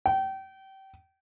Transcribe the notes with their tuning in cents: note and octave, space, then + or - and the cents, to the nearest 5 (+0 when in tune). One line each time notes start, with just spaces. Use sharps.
G5 -30